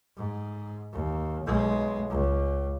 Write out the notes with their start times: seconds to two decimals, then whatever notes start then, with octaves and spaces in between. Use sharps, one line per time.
0.17 G#2
0.93 D#2
1.45 B1 G#3
2.10 C#2